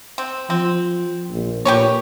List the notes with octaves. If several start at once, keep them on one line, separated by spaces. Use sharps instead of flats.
C4
F3 C4
A#1
A#2 G4 B4 C#5